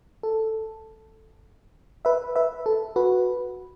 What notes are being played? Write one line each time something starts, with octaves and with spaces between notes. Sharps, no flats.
A4
B4 E5
B4 E5
A4
F#4 B4